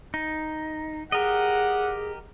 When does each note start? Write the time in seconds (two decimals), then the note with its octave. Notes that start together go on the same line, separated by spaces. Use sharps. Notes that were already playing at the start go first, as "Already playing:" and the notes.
0.14 D#4
1.12 G4 G#4 A#4 D#5 F#5